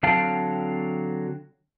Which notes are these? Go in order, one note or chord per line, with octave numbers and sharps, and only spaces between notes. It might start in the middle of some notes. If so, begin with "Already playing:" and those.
D3 F#3 C4 F5 G5 A5